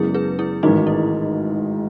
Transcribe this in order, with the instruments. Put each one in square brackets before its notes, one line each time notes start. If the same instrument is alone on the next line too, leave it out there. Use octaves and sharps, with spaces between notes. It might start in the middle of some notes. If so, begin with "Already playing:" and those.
Already playing: [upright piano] F#2 C#3 G#3 B3 [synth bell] E4 G#4
[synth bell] G#4 B4
E4 G#4
[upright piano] A1 G#2 D#3 [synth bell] D#4 F#4
[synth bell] E4